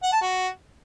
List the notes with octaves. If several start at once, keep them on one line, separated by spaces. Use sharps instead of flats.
F#5
A5
F#4